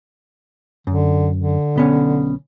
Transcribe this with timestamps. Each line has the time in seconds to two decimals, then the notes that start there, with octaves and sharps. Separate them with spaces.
0.87 F#2 D3
1.36 D3
1.76 B1 B3 C#4